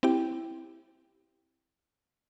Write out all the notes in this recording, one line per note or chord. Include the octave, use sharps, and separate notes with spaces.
C4 E4 G4 G5